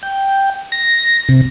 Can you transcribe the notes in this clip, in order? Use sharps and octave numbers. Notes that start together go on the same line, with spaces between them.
G5
A#6
C3